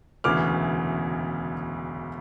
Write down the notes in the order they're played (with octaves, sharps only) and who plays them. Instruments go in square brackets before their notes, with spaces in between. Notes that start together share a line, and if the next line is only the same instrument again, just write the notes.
[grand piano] E1 D2 C#3 E3 D6 F6